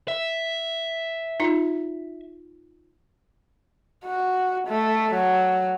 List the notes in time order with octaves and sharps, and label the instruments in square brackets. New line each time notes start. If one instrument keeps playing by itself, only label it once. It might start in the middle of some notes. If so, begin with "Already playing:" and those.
[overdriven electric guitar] E5
[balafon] D#4 F4
[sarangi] F#4
A3
F#3